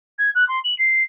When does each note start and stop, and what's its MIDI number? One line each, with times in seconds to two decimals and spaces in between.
0.19 0.30 92
0.35 0.47 90
0.49 0.59 84
0.64 0.77 102
0.79 1.03 96